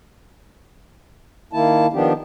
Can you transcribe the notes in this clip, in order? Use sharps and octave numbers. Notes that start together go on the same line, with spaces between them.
D#3 A#3 E4 A5
D#3 F3 B3 D4 G4